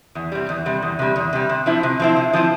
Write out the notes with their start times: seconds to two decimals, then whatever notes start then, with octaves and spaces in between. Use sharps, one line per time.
0.15 E2
0.32 C3 G3
0.49 E2
0.66 C3 G3
0.82 E2
0.99 C3 G3
1.16 E2
1.33 C3 G3
1.50 C3
1.66 F3 C4 E4
1.83 C3
2.00 F3 C4 E4
2.16 C3
2.33 F3 C4 E4